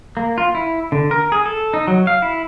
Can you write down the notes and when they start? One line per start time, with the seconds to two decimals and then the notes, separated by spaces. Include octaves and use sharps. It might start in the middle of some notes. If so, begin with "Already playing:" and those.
0.17 A#3
0.38 F4
0.55 E4
0.92 D3
1.11 A#4
1.32 G#4
1.46 A4
1.74 D#4
1.88 F#3
2.07 F5
2.22 E4